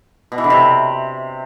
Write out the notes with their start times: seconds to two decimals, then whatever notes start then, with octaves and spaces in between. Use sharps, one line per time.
0.32 B2
0.38 E3
0.44 D3
0.50 C3